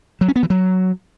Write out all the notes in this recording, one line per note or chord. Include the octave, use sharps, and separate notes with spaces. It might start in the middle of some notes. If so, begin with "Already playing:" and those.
F#3
C#4
B3
E3
F#3